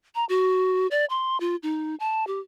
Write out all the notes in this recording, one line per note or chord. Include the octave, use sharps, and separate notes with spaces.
A#5
F#4
D5
C6
F4
D#4
A5
G4